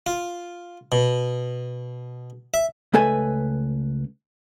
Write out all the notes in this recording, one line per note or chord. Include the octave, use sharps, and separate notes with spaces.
F4
B2
E5
C#2 A3 A4 B4 G#5